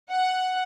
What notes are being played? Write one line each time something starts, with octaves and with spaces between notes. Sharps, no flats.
F#5